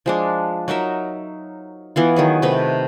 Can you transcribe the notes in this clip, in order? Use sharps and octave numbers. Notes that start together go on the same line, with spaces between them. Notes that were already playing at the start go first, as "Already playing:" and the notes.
F3 G#3 D4
F#3 D#4 A#4 E5
E3 B3 F4
D#3 F#3 G#4
C3 D#3 A3 B4